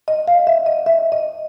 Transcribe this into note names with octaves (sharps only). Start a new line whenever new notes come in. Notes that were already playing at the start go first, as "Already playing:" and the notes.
D#5
F5
E5
D#5
E5
D#5